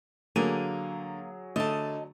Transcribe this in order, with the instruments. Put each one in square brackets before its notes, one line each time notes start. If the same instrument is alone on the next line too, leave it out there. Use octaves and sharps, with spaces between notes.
[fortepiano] D3 [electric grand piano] F#3 G#4 D#7 [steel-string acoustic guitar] A#3
[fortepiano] D3 A3 [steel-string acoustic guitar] D#5 A5